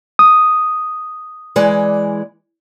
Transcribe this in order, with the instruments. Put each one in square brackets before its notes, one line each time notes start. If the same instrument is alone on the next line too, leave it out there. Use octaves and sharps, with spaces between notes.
[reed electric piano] D#6
[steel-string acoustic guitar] E3 G#3 D5